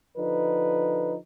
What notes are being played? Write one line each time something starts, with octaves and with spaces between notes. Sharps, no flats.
D3 F3 D#4 B4